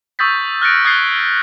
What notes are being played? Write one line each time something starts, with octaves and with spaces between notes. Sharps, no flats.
C#6 D#6 E6 G6 A6 B6
F6 F#6 A6 A#6 C#7 D7
D#6 F#6 G#6 A6 C7 G7